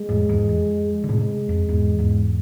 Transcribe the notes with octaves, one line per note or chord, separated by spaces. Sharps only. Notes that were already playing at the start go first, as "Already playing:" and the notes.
Already playing: G#3
F2 A2
E2 G#2
F2
D3
A2 C3 G#3
F2
E2 G#2
E2 G#2